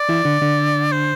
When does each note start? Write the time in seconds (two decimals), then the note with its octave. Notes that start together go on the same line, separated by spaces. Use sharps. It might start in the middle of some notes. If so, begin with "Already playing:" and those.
Already playing: D5
0.09 E3 E4
0.25 D3 D4
0.42 D3 D4
0.92 C5